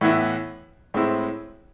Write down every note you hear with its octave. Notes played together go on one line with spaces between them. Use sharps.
A2 E3 B3 E4
A2 G#3 C4 E4